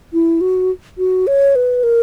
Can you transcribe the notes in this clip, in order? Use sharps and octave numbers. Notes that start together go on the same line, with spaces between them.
E4
F#4
F#4
C#5
B4
A#4